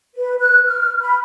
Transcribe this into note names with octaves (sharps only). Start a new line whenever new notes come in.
B4
F#6
F6
B5